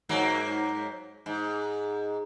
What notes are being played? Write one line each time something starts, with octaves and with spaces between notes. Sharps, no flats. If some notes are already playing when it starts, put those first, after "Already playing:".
G#2 F#3 A#3
G#2